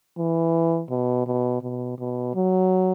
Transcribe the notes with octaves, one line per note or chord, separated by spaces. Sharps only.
E3
B2
B2
B2
B2
F#3